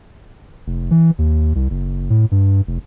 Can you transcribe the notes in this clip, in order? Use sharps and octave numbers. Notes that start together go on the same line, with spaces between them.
F1
E3
D#2
C2
F#1
A2
G2
F1